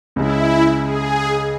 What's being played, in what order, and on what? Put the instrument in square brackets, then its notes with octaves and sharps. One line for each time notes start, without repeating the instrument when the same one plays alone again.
[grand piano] C#2 C#3 G#3 C#4 [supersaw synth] E4
[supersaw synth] G#4